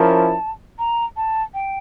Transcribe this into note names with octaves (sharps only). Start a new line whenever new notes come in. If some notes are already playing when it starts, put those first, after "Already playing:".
Already playing: F3 C#4 E4 A#4 A5
A#5
A5
G5